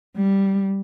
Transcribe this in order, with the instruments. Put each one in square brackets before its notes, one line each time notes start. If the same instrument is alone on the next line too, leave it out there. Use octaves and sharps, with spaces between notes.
[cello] G3